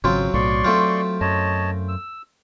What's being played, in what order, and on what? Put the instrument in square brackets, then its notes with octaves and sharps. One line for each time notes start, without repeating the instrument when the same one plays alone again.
[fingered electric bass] G#1 C#3 [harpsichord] F#3 C4 F4
[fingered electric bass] B1 A2 [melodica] D5 C6 C#6
[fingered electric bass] F#3 [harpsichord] A3 C4 F4
[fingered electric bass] F#2 [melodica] C#5 D#5 A5
[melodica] E6